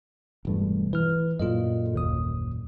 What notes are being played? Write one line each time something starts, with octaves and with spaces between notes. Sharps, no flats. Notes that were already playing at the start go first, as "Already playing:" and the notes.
E1 G2 A3
E3 B4 F6
F#2 A#2 F4 A4 D#5
G1 D#2 D#6